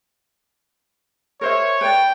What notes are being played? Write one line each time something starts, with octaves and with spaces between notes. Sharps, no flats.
A#4 C5 C#5 E5
B4 D5 G5